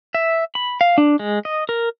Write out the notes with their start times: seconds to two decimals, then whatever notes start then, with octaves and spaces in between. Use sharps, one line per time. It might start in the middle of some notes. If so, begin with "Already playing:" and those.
0.15 E5
0.55 B5
0.81 F5
0.98 D4
1.19 G#3
1.45 D#5
1.69 A#4